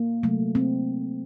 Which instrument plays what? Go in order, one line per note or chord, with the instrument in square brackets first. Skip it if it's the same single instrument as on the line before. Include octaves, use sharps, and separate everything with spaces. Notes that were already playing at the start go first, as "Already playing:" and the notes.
Already playing: [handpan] A#3
C3 F#3 A3
C4